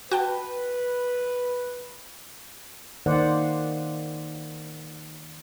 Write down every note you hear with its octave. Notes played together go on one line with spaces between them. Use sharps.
F#4 B4 G5 A5
D#3 A#3 D#4 C5 D5 F#5